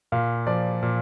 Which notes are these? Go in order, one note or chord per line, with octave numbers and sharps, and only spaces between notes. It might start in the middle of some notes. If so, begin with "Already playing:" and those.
A#2 F5
F3 D5
A#2